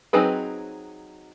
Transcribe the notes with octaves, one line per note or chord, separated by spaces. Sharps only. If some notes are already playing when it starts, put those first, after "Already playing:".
F#3 C4 D#4 G#4 B4